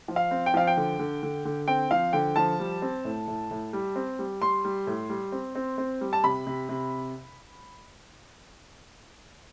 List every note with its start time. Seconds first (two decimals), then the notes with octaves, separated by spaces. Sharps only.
0.08 F3
0.16 F5
0.31 C4
0.46 G5
0.54 F3 F5
0.67 G5
0.77 D3
0.99 D3
1.23 D3
1.45 D3
1.68 C4 G5
1.91 F3 F5
2.13 D3 G5
2.36 F3 A5
2.59 G3
2.82 C4
3.05 A2
3.28 A2
3.51 A2
3.73 G3
3.96 C4
4.19 G3
4.42 G3 C6
4.65 G3
4.87 A2
5.10 G3
5.32 C4
5.55 C4
5.78 C4
6.01 G3
6.13 A5
6.24 C3 B5
6.47 C3
6.69 C3